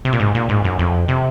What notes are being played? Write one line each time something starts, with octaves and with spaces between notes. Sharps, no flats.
C3
A#2
G#2
A#2
G#2
F#2
F2
C3